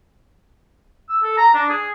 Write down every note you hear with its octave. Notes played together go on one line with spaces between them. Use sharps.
E6
A4
A#5
D4
G#4